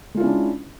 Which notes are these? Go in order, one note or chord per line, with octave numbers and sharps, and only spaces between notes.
G#3 C#4 D4 E4 F4